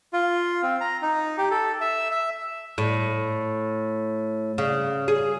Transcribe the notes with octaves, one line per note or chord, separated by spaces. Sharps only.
F4
C4
A#5
D#4
G4
A4
E5
E5
A2
C#3
G#4